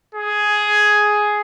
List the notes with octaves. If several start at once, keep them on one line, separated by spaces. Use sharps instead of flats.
G#4